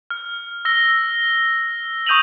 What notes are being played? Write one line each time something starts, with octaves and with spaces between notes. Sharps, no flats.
F6
E6 A#6 G7
C#6 D#6 G6 D#7 F7 F#7